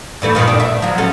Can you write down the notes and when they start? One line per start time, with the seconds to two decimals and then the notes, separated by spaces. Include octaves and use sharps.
0.22 G2 E3 A3
0.35 F2 A#2 D#3
0.48 D4
0.60 E5
0.82 F3 F#3
0.98 C#4 A4